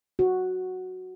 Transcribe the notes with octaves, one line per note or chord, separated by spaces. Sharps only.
F#4